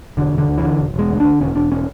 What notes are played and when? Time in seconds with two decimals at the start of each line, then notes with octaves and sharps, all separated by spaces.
0.17 E1 D3
0.33 E1
0.38 D3
0.48 D2
0.58 E3
0.63 D3
0.79 E1
0.94 E1 G#3
1.09 D2
1.20 D3 D4
1.41 E1 C#4
1.55 E1 D4
1.72 C#4